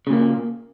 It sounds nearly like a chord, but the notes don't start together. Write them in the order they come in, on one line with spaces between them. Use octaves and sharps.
C#3 A#2 A#3